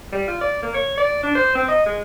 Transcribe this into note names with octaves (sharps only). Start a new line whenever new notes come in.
G3
F4
D5
A#3
C#5
D5
D4
C5
C4
D#5
G#3